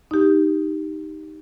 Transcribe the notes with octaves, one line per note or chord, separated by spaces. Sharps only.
D#4 G4